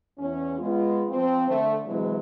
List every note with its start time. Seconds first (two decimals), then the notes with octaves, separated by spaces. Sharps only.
0.18 E2 C#4
0.59 G#3 B3 F4
1.08 F3 C4
1.48 D3 A3
1.85 C3 E3 F#3 G#3